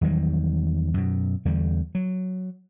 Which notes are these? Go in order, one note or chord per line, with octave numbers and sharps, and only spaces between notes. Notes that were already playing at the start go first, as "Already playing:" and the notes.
E2 D#3 F#3 G3
F#2 B2
E2 D3 G3
F#3